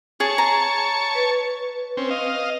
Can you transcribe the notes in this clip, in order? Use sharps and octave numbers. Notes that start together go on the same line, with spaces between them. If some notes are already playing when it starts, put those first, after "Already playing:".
G#4 C#5 A5 C#6
A#5
B4
C4 C#4
D#5 F5